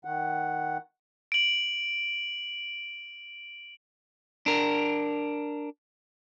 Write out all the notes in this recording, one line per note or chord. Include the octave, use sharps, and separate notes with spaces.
D#3 F#5
D7 F#7
D4 A#4